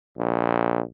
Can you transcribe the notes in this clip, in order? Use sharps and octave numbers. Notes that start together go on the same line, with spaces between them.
A#1